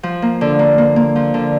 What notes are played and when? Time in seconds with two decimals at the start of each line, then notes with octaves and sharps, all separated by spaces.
0.03 F3
0.22 A#3
0.41 D3
0.59 A#3
0.78 A#3
0.96 A#3
1.16 F3
1.34 D3